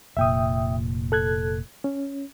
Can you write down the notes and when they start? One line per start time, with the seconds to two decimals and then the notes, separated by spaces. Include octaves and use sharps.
0.17 F1 A#2 E5 G5 D#6
1.12 A4 F#6 G#6
1.84 C#4